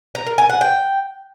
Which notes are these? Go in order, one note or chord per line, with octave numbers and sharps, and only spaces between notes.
A#5
A#4
G#5
F#5
G5